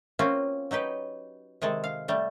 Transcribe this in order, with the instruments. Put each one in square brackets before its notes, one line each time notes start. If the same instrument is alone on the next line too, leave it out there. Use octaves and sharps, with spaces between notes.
[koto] A#3 C4 C#4 F4 F#4
F#3 D#4 G4 B4
C3 D#3 G#3 A4
F5
G3 A3